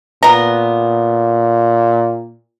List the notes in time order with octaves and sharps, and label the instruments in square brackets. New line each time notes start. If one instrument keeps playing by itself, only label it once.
[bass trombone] A#2 [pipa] B3 A#5